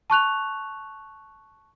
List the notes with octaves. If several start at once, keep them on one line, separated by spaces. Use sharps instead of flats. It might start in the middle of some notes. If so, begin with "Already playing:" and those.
A5 C#6 F#6 F7